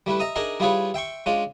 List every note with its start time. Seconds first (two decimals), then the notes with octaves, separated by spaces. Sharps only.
0.06 G3 A3 E4 B4
0.20 D#5 E5 A#5 D#6
0.36 D4 D#4 G#4 A#4 D#5 E5
0.60 G3 E4 F4 G#4 B4 C#5
0.94 E5 G5 C6 C#6
1.26 G#3 C#4 D4 F4